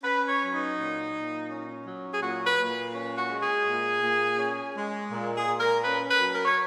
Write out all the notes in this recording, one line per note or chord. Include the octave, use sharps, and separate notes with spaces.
C#4 B4
C#5
F#3
D#4
A#2
A#2
C#4
F#3
G#4
A#2 F#4
B4
A#2
C#4
F#4
G#3
G#4
A#2
A#2
C#4
G#3
A#2
G#4
A#2
A#4
C#4 B4
B4
F#3
A#4
C#5